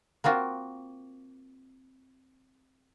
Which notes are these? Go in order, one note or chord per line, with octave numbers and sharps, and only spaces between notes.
A#3 C4 F4 F#4